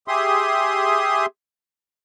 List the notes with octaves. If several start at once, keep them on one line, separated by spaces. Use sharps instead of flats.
G4 G#4 E5 C6 D#6